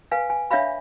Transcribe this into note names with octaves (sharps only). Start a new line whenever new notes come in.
B4 F5 G#5
G#5
D4 C#5 E5 F5 B5